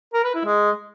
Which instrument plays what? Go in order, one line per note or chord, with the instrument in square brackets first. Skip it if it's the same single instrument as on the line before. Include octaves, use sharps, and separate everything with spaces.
[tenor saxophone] A#4
B4
E4
G#3